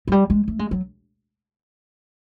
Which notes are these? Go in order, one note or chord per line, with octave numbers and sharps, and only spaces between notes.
F#3
G3
G#3
A3
G#3
F#3